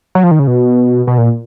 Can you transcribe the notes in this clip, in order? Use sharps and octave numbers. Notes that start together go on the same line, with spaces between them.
F#3
F3
D#3
C#3
B2
B2
A#2